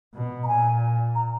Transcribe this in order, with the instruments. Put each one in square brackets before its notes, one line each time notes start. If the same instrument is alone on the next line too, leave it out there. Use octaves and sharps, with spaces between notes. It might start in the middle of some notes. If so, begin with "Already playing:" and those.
[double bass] B2
[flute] A#5
[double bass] A#2 [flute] G#5
[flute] A#5